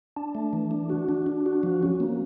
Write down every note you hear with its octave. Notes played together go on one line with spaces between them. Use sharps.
D4
A3
E3
D4
F#4
D4
D4
F#4
F3
C#4
A#3